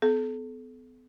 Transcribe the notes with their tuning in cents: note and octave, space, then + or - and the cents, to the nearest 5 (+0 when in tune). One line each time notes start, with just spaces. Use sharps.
B3 +35 A4 -35